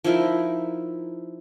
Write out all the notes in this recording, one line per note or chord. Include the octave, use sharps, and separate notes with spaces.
F3 D#4 E4 A#4